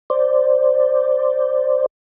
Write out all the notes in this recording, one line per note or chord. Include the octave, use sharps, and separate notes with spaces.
C5 D5